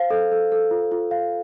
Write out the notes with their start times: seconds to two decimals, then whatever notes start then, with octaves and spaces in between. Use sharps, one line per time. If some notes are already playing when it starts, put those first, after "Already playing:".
Already playing: C5 F5
0.11 A4
0.32 A4
0.52 A4
0.71 F4
0.92 F4
1.11 F5